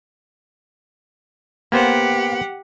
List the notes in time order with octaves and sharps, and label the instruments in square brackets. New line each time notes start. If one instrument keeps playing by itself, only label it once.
[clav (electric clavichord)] A#3 B3 C5 [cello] G4 F#5